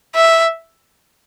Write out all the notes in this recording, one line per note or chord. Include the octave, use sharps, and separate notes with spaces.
E5